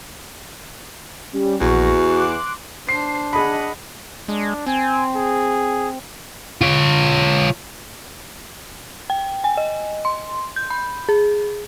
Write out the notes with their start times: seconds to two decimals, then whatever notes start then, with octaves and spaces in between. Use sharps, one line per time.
1.33 G3 C#4
1.60 A#1 E2 F#4 C#6 A#6
2.06 C6 D6 F#6
2.89 D4 C5 C7
3.33 G#4 D#5 F#5 B5
4.28 G#3 D4
4.67 C4 G#5
5.16 G#4
6.61 F4 C#5
9.10 G5
9.44 G#5
9.57 D#5
10.05 C6
10.56 G6
10.70 B5
11.09 G#4